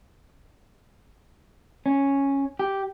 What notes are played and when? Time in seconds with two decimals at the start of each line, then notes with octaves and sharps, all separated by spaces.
1.86 C#4
2.59 G4